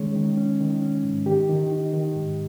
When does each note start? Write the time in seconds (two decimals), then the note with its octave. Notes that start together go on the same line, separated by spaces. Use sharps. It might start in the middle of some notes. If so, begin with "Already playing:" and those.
Already playing: D#3 G#3 C#4 C#5
0.15 D#3
0.37 C#4
0.60 D#3
0.82 C#4
1.04 G#2
1.26 D#3 G4
1.49 D#3
1.72 D#4
1.93 D#3
2.15 G#2